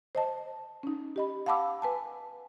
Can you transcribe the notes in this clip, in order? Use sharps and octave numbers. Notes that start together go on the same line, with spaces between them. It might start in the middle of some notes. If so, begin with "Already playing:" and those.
C5 D#5 A5
C#4 D#4
G4 D#5 B5
F5 F#5 A5 B5 D6 E6
B4 G#5 A5